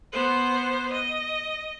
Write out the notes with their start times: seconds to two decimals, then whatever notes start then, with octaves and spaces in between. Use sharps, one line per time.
0.12 B3 C5
0.93 D#5